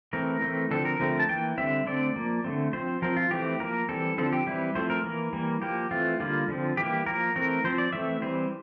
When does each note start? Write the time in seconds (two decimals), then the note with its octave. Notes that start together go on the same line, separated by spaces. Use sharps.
0.13 E3 A3 C4 A#4
0.42 E3 A3 C4
0.71 D3 F3 C4 A4
0.85 A#4
1.00 D3 F3 A3 C4
1.20 A5
1.29 E3 A#3 G5
1.58 D3 G3 C4 E5
1.86 D3 A3 C4 D5
2.16 F3 A#3
2.44 D3 A3 C4
2.73 F3 C4 C5
3.02 F3 C4 A#4
3.17 F4
3.31 E3 A3 C4 G4
3.60 F3 A#3 A#4
3.89 E3 G3 C4 A4
4.18 D3 F3 C4 A4
4.33 G4
4.47 E3 G3 C4 E4
4.75 F3 A3 C4 C5
4.90 A#4
5.04 E3 A#3
5.33 E3 G3 A#3
5.62 F3 A#3 G4
5.91 E3 A3 C4 F4
6.20 D3 G3 A#3 F4
6.48 D3 F3 C4
6.77 E3 G3 A#3 G4
7.06 F3 A#3 A#4
7.35 E3 A3 C4 A#4
7.64 F3 C4 C5
7.78 D5
7.93 E3 A3 C4 E5
8.22 E3 G3 C4 C5